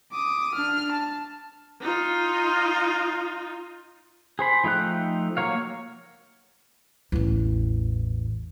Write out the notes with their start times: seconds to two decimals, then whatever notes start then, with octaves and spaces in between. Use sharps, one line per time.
0.12 D6 D#6
0.54 D4 F6
0.91 A5
1.82 D#4 F4
4.39 G#4 C5 B5
4.64 F3 A3 D#4 G5 F#6
5.37 F#3 A#3 C#5 F5
7.12 A1 E2